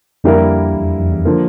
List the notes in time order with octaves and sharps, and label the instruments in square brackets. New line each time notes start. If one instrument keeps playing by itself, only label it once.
[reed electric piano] F2 [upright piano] D3 G3 A#3 E4 A#4
[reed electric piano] E2
F2
E2
[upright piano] D3 F3 A#3